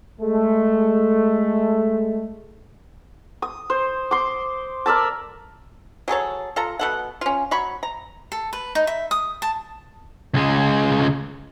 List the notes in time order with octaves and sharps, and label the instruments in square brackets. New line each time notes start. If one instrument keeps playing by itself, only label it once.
[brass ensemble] G#3 A3
[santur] D#6
C5
C6 D6
A#4 D5 E5 A5
[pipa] F#3 G#4 A4 C#5
F4 A4 A#5
B2 A4 F#5
C#4 F4
F#3 B5 C#6
A#5
[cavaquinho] A4
B4
D#4
E5
D#6
A5
[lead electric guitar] C#2 G#3